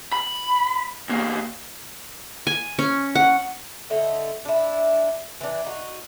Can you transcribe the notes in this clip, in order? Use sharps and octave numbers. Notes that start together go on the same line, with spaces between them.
B5
E2 A#3
G#5
C#4
F#5
D3 A3 D#5
D4 E4
E3 D4
D#4 F#4